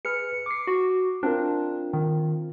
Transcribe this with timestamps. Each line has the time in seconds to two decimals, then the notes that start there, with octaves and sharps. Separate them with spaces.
0.05 G#4 B4 F6 C#7
0.46 D6 C7
0.67 F#4
1.23 C4 D4 F4 A#4
1.93 D#3